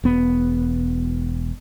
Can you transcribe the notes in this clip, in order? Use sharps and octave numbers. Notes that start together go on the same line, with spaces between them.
E1 B3